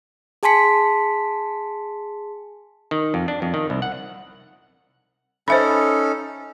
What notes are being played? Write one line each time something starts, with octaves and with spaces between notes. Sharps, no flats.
G#4 G#5 A5 C6 B6 C#7
D#3
F2
D4
F2
D#3
C2
F#5
C#4 D#4 A4 C5 E5 B5